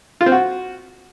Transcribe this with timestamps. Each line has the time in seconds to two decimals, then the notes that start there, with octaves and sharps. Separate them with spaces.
0.21 F4
0.26 C4
0.32 F#4